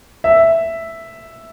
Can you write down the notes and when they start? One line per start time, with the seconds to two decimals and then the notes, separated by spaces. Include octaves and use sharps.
0.24 E5